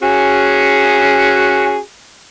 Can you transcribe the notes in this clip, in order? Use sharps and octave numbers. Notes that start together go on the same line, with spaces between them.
C#4 F#4 G#4